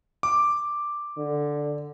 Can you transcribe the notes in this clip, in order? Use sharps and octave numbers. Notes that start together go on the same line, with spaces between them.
D6
D3